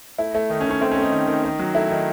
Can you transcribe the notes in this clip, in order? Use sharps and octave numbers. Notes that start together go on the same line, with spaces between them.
A3 E4
A3
D#3 D#4
C#4
D#3
C#4
A3 C4
C#4
A3 D#4
D#3
D#3
D#3
F#3
A3 E4
D#3